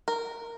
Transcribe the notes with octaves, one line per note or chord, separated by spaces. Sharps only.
A#4